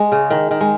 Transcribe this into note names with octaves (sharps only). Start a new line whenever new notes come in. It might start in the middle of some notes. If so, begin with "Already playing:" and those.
Already playing: G#3
C#3
D#3
D#3
G#3